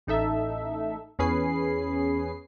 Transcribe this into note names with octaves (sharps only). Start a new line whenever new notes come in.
A1 D#4 A4 E5
E2 C#4 G#4 B4 C7